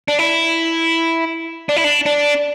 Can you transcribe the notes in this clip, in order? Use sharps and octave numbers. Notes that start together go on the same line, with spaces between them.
D4
E4
D4
E4
D4
D4